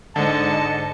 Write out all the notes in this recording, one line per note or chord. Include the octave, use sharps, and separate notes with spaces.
G#2 D3 D#5 A5 C#7